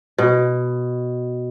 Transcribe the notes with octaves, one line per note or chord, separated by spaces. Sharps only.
B2